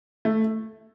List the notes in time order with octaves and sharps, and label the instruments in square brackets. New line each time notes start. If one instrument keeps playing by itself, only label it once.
[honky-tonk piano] A3